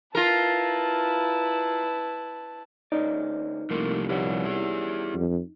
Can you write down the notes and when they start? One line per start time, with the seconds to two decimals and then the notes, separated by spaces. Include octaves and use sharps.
0.15 E4 F4 A#4 B4 A5
2.92 D2 C#4 D#4 D5
3.70 C2 F3 A3 A#3 F4
4.09 F3 G3 C#4 F#4 B4
4.45 E4 G#4
5.14 F2